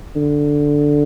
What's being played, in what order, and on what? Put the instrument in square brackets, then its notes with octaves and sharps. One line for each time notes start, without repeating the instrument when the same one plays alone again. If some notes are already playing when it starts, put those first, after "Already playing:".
[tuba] D3